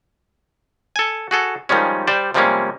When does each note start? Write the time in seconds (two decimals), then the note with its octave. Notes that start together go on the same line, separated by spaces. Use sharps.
0.96 A4 G#5
1.31 F#4 G#4 A4
1.69 D#3 F3 G3 G#3 C#4
2.07 G3 C5 D5
2.34 C3 F3 G3 G#3 A#3 C#4